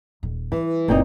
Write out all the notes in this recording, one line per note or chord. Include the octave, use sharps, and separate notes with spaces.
D#1
E3 G3
F#1 C#2 A#2 C4 D#4